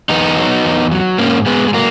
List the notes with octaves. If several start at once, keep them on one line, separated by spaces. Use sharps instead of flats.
E2 B3 D#4
F#3
E2
F#3
G#2 A#3 C#4
G#2 G#3 B3
G#3
F#3 A#3